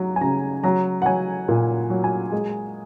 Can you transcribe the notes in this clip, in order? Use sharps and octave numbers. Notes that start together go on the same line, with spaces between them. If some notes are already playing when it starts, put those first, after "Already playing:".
Already playing: F#3 A#5
G#5
C#3 A#5
F#3 A#5
F#5
F#3 G#5
A#2
F#3
G#5
G#3